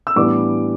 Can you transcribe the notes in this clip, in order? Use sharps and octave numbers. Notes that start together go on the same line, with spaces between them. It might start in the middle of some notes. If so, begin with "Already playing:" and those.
E6
A2 E3 G3 B3 D4 D6